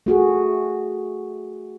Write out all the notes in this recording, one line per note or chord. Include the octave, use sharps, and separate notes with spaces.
A3 F#4 G#4